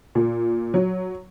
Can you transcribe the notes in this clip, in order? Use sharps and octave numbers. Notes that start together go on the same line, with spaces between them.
A#2
F#3